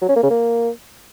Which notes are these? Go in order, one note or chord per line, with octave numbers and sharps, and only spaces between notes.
F#3
C#4
A#3
C#3
A#3